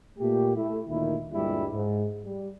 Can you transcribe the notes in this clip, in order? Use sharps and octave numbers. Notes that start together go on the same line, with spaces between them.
A#2 A3 G4
A3 E4
D2 A#2 D#3 E4
D2 G2 A#2 G3 G#3 E4
G#2
G3